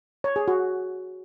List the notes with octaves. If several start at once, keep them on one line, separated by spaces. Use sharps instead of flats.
C#5
G#4
F#4